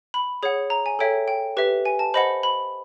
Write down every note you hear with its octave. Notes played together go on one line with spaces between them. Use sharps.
B5
G#4 C#5 F#5
A#5
G#5
A4 C#5 E5 G5
G5
G4 B4 E5
G#5
A5
C5 D#5 F#5 B5
B5